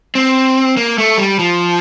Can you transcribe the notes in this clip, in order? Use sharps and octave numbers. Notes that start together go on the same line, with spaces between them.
C4
A#3
A3
G3
F3